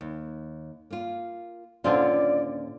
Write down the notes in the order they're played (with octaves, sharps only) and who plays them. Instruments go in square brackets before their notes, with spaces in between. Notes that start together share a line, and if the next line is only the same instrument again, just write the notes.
[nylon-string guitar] D#2
A#3 F4
[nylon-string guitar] D#2 A#2 C#4 [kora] D3 C4 F4 [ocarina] D5